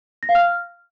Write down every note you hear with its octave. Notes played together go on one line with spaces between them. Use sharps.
A#6
F5
F6